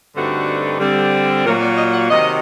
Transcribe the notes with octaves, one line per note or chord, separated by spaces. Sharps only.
G2 D3 A3 C4 D#4 F#4
D3 G3 C4
A#2 F#3 A#3 A#4
D5
D#5
F#5
C3 D#3 F#3 D#5